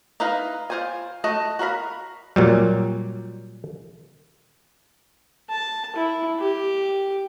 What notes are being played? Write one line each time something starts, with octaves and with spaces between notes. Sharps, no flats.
D#4 E4 B4 D#5 F5
F4 F#4 C5 G5 G#5
A3 F#4 D#5
F#4 A#4 F5 B5
A#2 F#3 G3
A5
E4
G4